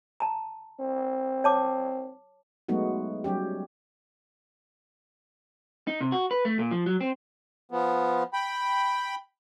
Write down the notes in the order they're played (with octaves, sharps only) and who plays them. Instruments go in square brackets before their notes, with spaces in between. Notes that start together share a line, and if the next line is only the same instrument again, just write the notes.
[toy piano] A5 A#5
[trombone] C4
[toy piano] C#5 A5 D6
[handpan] F#3 G#3 A3 B3 D#4 F#4
F#3 G3 C#4 G4
[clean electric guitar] D#4
C3
F#4
B4
A3
A#2
F3
F#3
C4
[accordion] F3 B3
G5 B5